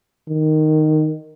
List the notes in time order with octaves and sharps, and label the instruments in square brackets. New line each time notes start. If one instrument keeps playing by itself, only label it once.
[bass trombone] D#3